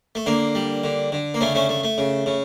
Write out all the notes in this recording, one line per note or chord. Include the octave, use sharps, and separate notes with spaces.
A3
D3 A#3
G3
D3
D3
A#3
C#3 A3 C#4
A3 C#4
A3
A3
C#3
C#3